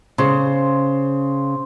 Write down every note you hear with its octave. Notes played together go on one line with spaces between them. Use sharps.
C#3 C5